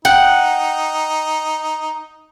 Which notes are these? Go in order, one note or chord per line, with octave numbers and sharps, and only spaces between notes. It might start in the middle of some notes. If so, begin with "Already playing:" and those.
D#4 F#5 G5